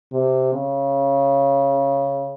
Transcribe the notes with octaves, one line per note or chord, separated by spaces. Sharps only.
C3
C#3